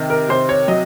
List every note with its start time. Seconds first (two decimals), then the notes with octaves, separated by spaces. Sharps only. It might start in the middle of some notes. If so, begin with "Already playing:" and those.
Already playing: C3 D#3
0.10 A#4
0.29 C3 C5
0.49 C#5
0.68 F#3 D#5